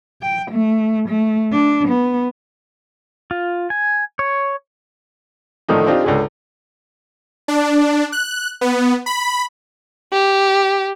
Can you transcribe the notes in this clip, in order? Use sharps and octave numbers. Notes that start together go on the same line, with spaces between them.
G5
A3
A3
D4
B3
F4
G#5
C#5
A2 D3 D#3 F3 D#4
C4 D4 D#4 F4 G4
C#2 D3 G#4
D4
F#6
B3
B5
G4